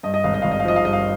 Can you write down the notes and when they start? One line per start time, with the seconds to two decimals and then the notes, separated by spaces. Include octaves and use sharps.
0.03 G2 D#5
0.14 D#5
0.24 G#1 F5
0.34 D#5
0.42 G#1 F5
0.52 D#5
0.60 F5
0.64 F3 D#5
0.76 F5
0.84 G2 D#5
0.93 F5